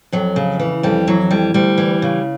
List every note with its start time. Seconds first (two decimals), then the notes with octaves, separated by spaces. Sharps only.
0.12 F2 F#3
0.36 C#3
0.59 E3
0.83 F2 G3
1.07 E3 F#3
1.31 F2 G3
1.54 D2 G3
1.78 E3
2.02 C#3